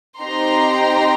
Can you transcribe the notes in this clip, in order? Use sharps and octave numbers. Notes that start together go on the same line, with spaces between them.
C4 D#4 G4 A#5 C6